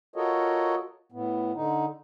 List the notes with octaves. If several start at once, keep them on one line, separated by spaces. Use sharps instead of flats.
F4 F#4 A4 A#4 C#5 D#5
A2 B3
D3 D#4